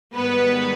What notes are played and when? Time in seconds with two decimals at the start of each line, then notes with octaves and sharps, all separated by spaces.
0.14 G#2 D#3 G3 B3 B4